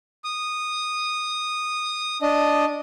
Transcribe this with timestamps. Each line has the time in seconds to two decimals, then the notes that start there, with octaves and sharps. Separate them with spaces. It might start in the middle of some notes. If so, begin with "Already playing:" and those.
0.24 D#6
2.22 D4 D#5